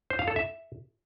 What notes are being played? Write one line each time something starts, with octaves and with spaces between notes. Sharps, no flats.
C5
F5
A4
E5